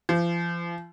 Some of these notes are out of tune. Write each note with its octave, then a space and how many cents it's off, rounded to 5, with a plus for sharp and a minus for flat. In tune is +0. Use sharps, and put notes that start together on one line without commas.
F3 -35